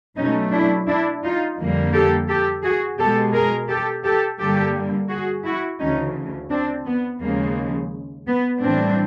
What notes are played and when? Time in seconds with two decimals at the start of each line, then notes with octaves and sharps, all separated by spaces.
0.16 B2 F#3 A3 C#4 D#4
0.52 D4 E4
0.87 D4 E4
1.23 D#4 F4
1.57 F2 D3 G3 A#3
1.93 G4 A4
2.28 G4 A4
2.63 F#4 G#4
2.98 B2 G#3 G4 A4
3.33 G#4 A#4
3.69 G4 A4
4.04 G4 A4
4.39 G2 D3 G3 A#3 G4 A4
5.09 F#4 G#4
5.45 E4 F#4
5.80 D2 C#3 E3 C#4 D#4
6.50 C4 D4
6.86 B3
7.21 D#2 C#3 F3 G#3 A#3
8.27 B3
8.61 A2 E3 G3 C4 D4